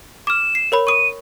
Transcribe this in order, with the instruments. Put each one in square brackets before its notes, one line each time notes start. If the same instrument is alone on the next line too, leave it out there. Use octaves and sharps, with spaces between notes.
[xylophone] D6 F6 [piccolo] E7
[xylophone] C7
A#4 C#5 B5
[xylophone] C#6 D#6 [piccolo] D#7